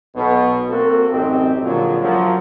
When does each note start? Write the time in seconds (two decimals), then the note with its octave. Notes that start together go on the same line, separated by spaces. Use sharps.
0.16 B1 B2
0.70 A#3 C4 F#4 A4
1.11 A1 F#2 C4 D#4 G4
1.63 A#2 D3 F3 F#3 G#3
2.01 F#2 F3 F#3